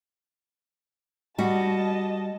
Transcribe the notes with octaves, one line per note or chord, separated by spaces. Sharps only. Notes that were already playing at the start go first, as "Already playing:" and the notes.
G3 F#4 D#5 A5